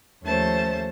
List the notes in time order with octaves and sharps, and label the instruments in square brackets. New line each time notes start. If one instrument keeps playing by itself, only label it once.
[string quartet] D#2 F3 A3 C#4 C5 A5